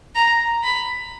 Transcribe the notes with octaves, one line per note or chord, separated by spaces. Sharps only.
A#5
B5